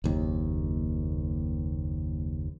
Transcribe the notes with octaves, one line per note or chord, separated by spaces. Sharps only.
F#1 D#2